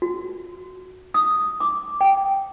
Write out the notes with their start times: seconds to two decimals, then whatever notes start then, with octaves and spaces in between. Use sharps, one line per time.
0.02 F#4
1.14 D#6
1.60 D6
2.01 G5